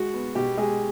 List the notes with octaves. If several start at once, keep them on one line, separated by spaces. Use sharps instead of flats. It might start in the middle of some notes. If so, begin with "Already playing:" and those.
Already playing: G#3 F#4
B3
B2 G4
G#3 G#4